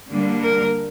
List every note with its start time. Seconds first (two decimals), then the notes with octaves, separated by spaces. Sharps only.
0.11 D3 G3 A#3 D4
0.43 A#4